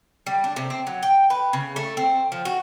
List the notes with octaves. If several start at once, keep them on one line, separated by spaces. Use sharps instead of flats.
G3
D4
C3
C4
F#3
G5
B4
C#3
A3
C4
F3
F#4